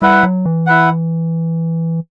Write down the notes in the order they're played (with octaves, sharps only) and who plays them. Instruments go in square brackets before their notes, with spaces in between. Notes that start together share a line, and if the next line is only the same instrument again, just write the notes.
[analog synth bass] G3 [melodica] E4 B4 F#5
[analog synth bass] F#3
E3
[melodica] E4 B4 F#5